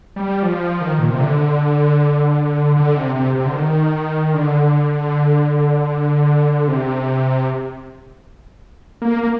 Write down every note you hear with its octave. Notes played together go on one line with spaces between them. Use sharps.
G3
F3
D#3
A#2
C3
D3
D3
C3
C3
C3
D3
D#3
D3
C3
A#3
A#3